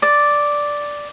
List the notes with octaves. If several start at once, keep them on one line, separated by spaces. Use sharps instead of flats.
D5